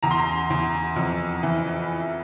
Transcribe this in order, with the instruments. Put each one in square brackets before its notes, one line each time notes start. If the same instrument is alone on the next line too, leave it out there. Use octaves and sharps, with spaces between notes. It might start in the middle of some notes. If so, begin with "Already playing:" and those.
[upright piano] E2 A#5
C6
A#5
E2
F2
E3